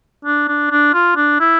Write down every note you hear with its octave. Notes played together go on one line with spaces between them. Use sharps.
D4
D4
D4
F4
D4
E4